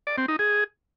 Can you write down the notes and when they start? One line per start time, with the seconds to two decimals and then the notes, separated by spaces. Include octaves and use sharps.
0.07 D5
0.18 C4
0.28 D#4
0.39 G#4